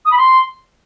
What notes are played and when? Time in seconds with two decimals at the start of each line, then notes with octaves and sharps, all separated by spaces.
0.05 D#6
0.11 B5
0.18 C6